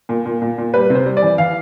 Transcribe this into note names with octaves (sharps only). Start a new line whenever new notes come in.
A#2
A#2
A#2
A#2
G3 B4
C3
C5
G3
D5
E3
E3 F5